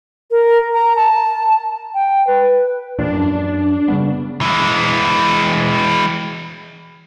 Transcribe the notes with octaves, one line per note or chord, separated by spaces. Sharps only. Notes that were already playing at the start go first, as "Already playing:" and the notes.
A#4
A#5
A5
G5
B4
E2 A#2 F3 D4
F#2
C#3 G3 B3
E3 G#3